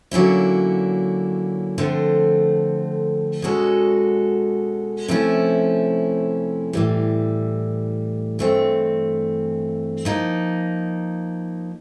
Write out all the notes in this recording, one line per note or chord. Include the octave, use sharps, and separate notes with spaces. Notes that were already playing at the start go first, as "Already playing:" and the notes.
D3 F#3 A#3 C#4 E4
D3 F3 A3 C4
B2 G#3 C#4 F#4 A4
C3 F3 A3 C#4 E4
A2 E3 G3
G2 E3 A3 C4
F3 A#3 D#4